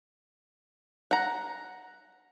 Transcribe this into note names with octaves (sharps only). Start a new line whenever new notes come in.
F#5 A#5